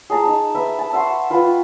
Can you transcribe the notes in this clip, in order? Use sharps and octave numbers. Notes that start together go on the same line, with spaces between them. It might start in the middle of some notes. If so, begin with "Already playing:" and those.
G#4 D#5 A5 A#5
D#4
B4 E5 B5
A5
E5 F#5 C6 C#6
F4 B4 G5